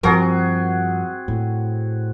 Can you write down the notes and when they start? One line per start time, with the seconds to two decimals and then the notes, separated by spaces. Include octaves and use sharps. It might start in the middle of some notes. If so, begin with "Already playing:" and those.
0.03 G2 F3 C4 F#4 G#4 A#4
1.28 A2